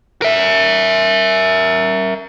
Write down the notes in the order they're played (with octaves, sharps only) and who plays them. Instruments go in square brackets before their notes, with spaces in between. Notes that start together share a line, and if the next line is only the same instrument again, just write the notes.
[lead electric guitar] A#4 E5